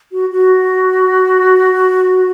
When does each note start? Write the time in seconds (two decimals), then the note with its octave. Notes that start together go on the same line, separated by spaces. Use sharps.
0.12 F#4
0.31 F#4